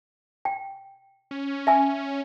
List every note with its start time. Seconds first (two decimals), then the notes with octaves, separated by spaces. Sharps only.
0.45 G5
1.31 C#4
1.67 E5 G#5 E6